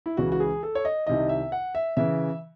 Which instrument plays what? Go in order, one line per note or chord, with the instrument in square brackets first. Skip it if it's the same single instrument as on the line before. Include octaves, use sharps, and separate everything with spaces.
[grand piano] E4
C#2 C#3 E3 F#4
F#4
G#4
A4
C#5
D#5
C2 C3 D#3 D#5
E5
F#5
E5
C#3 E3 E5